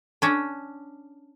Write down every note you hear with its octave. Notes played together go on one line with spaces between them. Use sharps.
C#4 D4